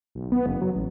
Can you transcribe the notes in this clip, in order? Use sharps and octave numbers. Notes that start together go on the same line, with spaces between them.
B1
B3
F#1
F#3
A1